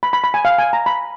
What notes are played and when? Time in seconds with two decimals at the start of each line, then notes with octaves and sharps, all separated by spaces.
0.03 B5
0.13 B5
0.24 B5
0.34 G#5
0.45 F5
0.58 G#5
0.73 A#5
0.86 B5